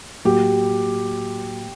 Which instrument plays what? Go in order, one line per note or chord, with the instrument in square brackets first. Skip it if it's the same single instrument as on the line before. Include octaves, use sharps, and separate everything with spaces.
[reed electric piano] A2 F#3 A#3 F#4 [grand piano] G4